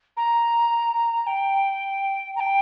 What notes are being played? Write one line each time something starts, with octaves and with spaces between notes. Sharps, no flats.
A#5
G5
A#5
G5